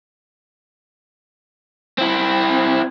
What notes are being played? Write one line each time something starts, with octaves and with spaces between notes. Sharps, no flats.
C4 E4